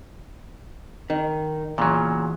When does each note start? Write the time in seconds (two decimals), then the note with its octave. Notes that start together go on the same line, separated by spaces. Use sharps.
1.10 D#3
1.78 E2 A#2 C#3 F#3